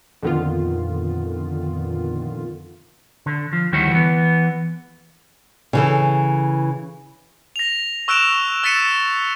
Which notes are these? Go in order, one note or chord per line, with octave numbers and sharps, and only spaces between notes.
F2 A#2 D3 D#3 B3 F4
D3
F3
D2 D#3 G3 E4 F#4 C#5
E3 B3
C#3 E3 A4
A#6 F7
C#6 E6 F#6 D7 E7 F7
E6 A6 B6 C#7 D#7